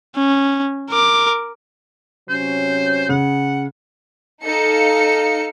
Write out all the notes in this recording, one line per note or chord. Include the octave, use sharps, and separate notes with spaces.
C#4
A#4 D6
C3 F#3 C#4 C5
C#3 F#5
D#4 A4 F5 C#7